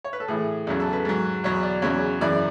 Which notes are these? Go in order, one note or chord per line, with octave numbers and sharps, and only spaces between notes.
C#5
B4
A4
A2 E3 G#4
E2 C#3 F#3
A4
B4
G#2 F#3
E2 B2 F#3 C#5
D5
E2 C#3 F#3 C#5
F#2 C#3 E3 D5